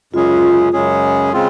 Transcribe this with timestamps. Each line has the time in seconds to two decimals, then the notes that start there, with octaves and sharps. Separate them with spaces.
0.13 F#2 C#3 G#3 C#4 F4 G#4
0.73 F#2 C#3 G#3 C#4 G#4
1.33 C#3 G#3 C4 F4